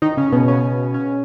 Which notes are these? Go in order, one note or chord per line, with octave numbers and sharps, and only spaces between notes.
D#3 D#4
C#3 C#4
B2 B3
C#3 C#4
C#3 C#4